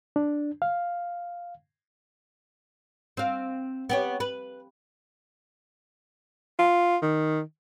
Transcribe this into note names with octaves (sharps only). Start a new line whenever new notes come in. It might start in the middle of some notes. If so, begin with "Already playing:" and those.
D4
F5
C4 F5
B3 G4 C#5
B4
F4
D#3